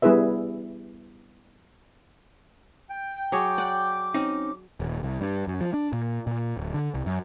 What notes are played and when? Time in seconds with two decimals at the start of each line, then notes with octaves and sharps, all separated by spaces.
0.02 G3 B3 E4 G#4 B4 E5
2.90 G5
3.32 F#3 G#4 C#5 D6
3.58 D5 F#5
4.14 C4 C#4 D#4
4.80 D#1
5.03 C2
5.21 G2
5.47 F#2
5.61 F3
5.74 D4
5.93 A#2
6.27 A#2
6.57 D1
6.74 D3
6.94 C2
7.06 F#2